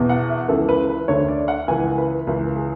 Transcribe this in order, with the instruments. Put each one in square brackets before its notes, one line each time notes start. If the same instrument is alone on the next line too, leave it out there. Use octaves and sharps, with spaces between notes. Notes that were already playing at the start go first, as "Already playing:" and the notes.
Already playing: [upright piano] E2 B2
F#5
E5
C#2 C#3 E3 A4
B4
B4
D2 D3 C#5
D5
F#5
C#2 C#3 E3 G#5
B4
C#2 C#3 E3 B4
G#4